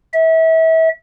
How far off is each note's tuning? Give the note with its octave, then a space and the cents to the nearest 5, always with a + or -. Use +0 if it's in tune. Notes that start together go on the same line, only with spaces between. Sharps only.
E5 -30